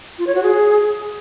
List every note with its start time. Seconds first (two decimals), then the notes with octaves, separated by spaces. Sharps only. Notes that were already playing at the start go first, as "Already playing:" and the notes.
0.19 F4
0.27 C#5
0.35 F#4
0.43 G#4